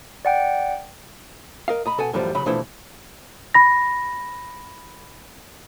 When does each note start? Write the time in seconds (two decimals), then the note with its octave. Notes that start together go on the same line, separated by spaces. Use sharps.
0.25 D5 F#5 G5
1.68 A#4 D#5 F5
1.86 D#5 A#5 B5
1.98 B2 A4 F#5 G#5
2.13 F#2 A2 E3 F3 G3
2.35 C#2 C#3 F#3 B5
2.46 B2 D3 E3 F3 A3 E4
3.54 B5 A#6